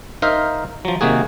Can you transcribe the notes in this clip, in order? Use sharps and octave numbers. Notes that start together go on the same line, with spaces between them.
D#4 A#4 C5 E5 F5
F3 F#3
C3 D#3 A#3 F#4 G#4